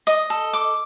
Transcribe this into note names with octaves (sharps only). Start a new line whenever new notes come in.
D#5
A4
D6